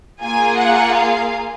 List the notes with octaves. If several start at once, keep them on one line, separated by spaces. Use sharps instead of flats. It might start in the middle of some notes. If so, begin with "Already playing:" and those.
A#3 F4 G#4 G#5
F#5
F5